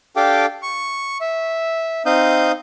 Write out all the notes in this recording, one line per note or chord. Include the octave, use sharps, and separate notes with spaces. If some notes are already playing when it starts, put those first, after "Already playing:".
D4 G4 A4 F5 G5 D6
C#6
E5
C4 D#4 F5 D#6 G6